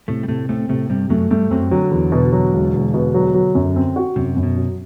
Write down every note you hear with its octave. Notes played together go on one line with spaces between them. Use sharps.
A2 C3 A3
G3
A2 C3 A3
A2 A3 C4
A2 C3 A3
G2 C3 G3
F#2 F#3 A3
G2 G3 A3
F#2 F#3 C4
D3 F#3
E2
B2
F#3
E1
E1
B2
F#3
F#3
F#2
C4
F#4
F#2 C3
F#2
B2
F#3